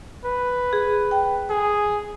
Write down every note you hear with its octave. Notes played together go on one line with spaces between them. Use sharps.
B4
G#4
G5
G#4